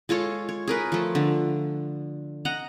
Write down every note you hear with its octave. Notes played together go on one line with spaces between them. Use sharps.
G#3 F4 A4 C#5
C#5
G#4 A#4 B4
F3 A3
D3
D#5 F#5 A#5